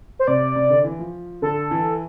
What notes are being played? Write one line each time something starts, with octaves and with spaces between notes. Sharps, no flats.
C5
C3 D5
C3
D3
E3
F3
D3 A4
E3